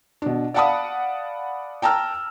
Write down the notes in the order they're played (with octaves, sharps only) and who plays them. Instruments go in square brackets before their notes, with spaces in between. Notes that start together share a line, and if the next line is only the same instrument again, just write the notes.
[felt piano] B2 D4
D5 F5 F#5 A5 B5 D#6
G5 A5 A#5 E6 F6